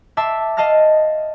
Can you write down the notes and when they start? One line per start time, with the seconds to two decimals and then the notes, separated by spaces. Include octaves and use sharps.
0.17 E5 A5 C6 D6 E6
0.57 D#5 F5 A5 F6 A#6